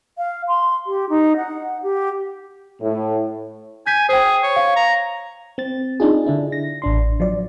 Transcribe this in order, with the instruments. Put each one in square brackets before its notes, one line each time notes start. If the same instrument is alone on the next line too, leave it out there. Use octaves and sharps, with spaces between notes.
[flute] F5
C6
G4
D#4
F#5
G4
[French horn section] A2
[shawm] G#5 [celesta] G6 B6
[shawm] G#4 [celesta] C5 G5
[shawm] C#5
[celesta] F5
[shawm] A#5
[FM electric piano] C4 A6
D4 D#4 F4 G#4
D3 D4 E4
A#6
A1 D4 C6
F3 F#3 D5